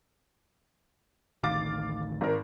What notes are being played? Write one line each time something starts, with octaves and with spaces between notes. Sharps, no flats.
A1 D2 D#3 F5 D6 A6
G#1 A#4